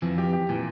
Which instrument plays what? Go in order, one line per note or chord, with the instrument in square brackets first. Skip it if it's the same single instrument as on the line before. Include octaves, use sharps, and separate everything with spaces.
[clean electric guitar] F2 F3 [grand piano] E3
[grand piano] G4
G4
[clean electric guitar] A#2 [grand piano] E3